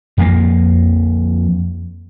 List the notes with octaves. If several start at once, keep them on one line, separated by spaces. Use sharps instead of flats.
F2 F3 G3 A#3